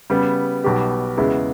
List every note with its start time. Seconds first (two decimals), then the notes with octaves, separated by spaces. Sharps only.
0.10 C#3 G3 B3
0.64 B1 B2 G3 B3 G4
1.18 E2 C#3 G#3 B3 E4